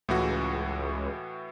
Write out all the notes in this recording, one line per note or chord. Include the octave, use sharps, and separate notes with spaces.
C#2 A2 E3 F#4